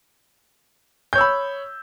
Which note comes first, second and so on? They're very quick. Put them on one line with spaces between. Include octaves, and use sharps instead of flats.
G6 C#5 E6 B5